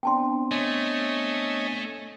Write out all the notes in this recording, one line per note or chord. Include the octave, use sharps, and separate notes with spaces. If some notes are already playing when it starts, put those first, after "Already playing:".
B3 C4 D4 G5 A5 C6
A3 C#5 D#5 G#5